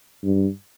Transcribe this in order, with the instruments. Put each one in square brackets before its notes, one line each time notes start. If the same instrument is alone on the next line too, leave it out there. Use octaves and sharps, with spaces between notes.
[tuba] G2